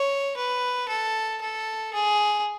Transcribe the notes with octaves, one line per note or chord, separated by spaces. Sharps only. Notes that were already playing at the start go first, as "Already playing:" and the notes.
Already playing: C#5
B4
A4
A4
G#4